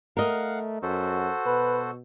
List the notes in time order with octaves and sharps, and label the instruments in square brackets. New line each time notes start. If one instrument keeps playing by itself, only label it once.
[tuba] A3 [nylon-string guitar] A#4 D#5 [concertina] F5 F#5
[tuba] F#2 [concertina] F#4 A4 C5
[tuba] B2 [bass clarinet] B4